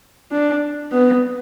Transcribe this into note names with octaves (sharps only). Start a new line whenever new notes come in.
D4
B3